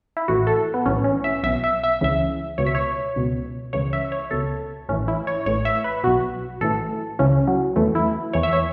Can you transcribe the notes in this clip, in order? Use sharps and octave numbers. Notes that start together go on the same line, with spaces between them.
E4
A1 A2 E3 F#4
A4
B3
B1 A2 E3 C#4
C#4
E5
B1 B2 E5
E5
E5
C#2 C#3 E3 E5
C#2 B2 C#5
E5
C#5
C#2 B2
C#2 C#3 E3 C#5
E5
C#5
C#2 B2 A4
A1 A2 E3 C#4
E4
C#5
A1 A2 E3 C#5
E5
B4
B1 B2 F#4
A1 A2 E3 A4
C#2 C#3 E3 C#4
F#3
E2 E3 A3
E4
E2 E3 C#5
E5
C#5